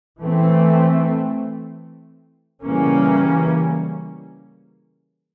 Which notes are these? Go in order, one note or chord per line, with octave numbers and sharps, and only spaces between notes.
E3 A3 C4
C#3 E3 G3 A#3 C#4